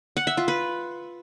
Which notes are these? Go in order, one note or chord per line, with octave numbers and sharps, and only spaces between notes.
F#5
E5
F4
B4